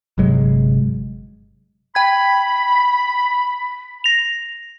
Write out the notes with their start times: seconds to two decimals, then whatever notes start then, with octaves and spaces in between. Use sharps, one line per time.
0.18 G1 C3 F#3 G#3
1.95 G5 B5 G#6
4.04 A#6 F7